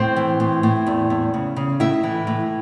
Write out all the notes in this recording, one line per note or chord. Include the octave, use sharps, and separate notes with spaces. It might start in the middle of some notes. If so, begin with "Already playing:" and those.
Already playing: A2 C4 C5
E3
A2
A2
E2
E2
C#3
C#3
A2 E4 E5
E3
A2